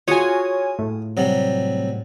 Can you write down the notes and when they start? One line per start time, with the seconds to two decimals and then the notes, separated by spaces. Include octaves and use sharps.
0.08 F4 F#4 G#4 C#5 G#5 D#6
0.79 A2
1.17 C3 F#3 G3